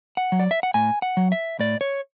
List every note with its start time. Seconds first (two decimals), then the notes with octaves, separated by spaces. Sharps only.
0.17 F#5
0.32 F#3
0.40 D5
0.51 E5
0.63 F#5
0.74 A2 G#5
1.02 F#5
1.17 F#3
1.32 E5
1.59 A2 D5
1.81 C#5